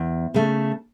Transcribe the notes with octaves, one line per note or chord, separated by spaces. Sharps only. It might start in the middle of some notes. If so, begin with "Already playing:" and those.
Already playing: E2
C#3 A3